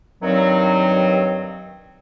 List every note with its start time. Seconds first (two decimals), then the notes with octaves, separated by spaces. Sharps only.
0.22 G2 D#3 F#3 C4